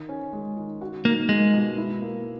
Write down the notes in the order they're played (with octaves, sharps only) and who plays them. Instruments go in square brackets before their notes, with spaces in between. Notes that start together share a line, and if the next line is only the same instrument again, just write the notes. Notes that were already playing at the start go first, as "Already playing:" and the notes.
Already playing: [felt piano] D#3
C#4
G#3
D#3
F#4
[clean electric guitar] A#3 [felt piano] D#4
[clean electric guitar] G#3 [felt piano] A#3
[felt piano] B2
E4
A#3